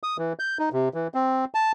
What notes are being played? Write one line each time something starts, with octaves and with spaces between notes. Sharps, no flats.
D#6
E3
G6
D#4
C3
E3
C4
A5